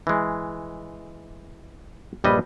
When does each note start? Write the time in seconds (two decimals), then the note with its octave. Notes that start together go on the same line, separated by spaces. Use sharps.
0.07 E3 G#3
2.24 A#1 G2 G3 B4 D#5